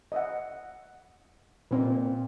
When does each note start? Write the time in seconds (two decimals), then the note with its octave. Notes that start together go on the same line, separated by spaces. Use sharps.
0.12 D#5 E5 F#5
1.71 A#2 C4 D#4 B4